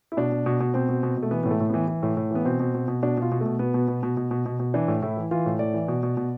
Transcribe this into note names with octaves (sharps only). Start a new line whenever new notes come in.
E4
B2 D4
B2
B2
B2
B2 C4
B2
B2
B2
A3
E3 B3
A2 B3
A3
A2
E3 B3
E3
A2
A2
E3 B3
B2 C4
B2
B2
B2
B2 D4
B2 F4
B2
A3
B2
B2 B3
B2
B2
B2
B2
B2
B2
B2
E3 D4
A2
A2 E4
E3
E3 F4
A2
A2 D5
E3
B2
B2
B2